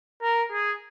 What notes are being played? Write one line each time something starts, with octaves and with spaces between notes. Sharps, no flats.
A#4
G#4